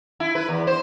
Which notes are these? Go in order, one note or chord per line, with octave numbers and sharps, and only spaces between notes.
E4
B4
E2
C5